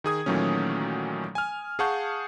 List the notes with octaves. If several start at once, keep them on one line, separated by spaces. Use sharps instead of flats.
D#3 G#4 D#6 G#6
A#2 D#3 E3 F#3 A3 C#4
G#5 F6
G#4 F5 F#5 A5 C#6 G6